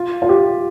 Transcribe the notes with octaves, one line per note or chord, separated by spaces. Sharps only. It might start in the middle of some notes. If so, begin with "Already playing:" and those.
Already playing: F4
F4
G4